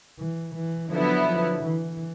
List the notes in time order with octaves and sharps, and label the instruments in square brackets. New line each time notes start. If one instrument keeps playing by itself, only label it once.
[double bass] E3
E3
[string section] D3 F#3 B3 E4 [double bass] F3
[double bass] F3
E3